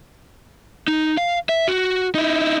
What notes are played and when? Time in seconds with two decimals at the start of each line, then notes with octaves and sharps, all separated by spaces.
0.88 D#4
1.17 F5
1.49 E5
1.68 F#4
2.15 D#4 E4